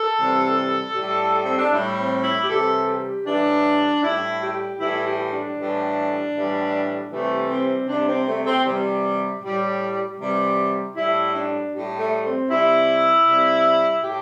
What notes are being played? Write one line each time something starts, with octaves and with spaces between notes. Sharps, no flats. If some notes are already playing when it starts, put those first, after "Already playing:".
Already playing: A4
C3 E3 G3
A2 G3
C4
D4
A2 G3 E4
C4
E4
G4
C3 E3 G3 A4
G4
A2 E3 G3 D4
A2 G3 E4
G4
A2 E3 G3 E4
G4
D4
A2 E3 G3
A2 E3 G3
C3 E3 G3 A3
C4
C3 G3 D4
C4
A3
C4
C3 E3 G3
A2 G3
C3 E3 G3
A2 G3 E4
D4
A2 G3
A3
C4
C3 G3 E4
C3 G3
A2 G4